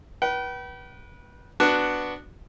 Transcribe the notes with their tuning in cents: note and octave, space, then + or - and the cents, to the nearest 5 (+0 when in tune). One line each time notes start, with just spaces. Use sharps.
B4 -25 G5 -40
B3 +0 D4 +0 F#4 +0